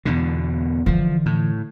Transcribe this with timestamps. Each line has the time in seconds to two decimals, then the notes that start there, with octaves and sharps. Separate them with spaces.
0.05 E2 B2 D3
0.86 D3 E3 F3
1.26 A2